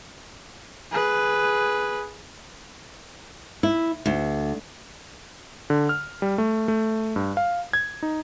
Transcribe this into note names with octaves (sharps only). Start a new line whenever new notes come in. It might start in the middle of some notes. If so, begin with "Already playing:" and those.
G#4 B4
E4
D2
D3
F6
G3
A3
A3
G2
F5
G#6
D#4